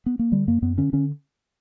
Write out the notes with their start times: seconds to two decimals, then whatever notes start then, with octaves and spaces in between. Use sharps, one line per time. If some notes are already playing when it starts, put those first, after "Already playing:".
0.06 B3
0.19 A#3
0.32 D3 G3
0.47 F#2 A#3
0.62 F#2 B3
0.78 D3 C#4
0.93 D3 C#4